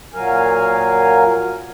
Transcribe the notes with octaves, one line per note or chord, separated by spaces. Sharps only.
A#2 F#3 A#4 F5 G#5